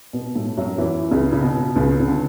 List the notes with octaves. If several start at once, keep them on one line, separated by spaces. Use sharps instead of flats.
B2 B3
A2 A3
F#2 F#3
E2 E3
C#2 C#3
C#3
B2
C#2 C#3
C#3
D3